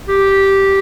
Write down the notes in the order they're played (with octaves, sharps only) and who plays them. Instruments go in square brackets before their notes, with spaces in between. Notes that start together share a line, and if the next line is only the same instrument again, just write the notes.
[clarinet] G4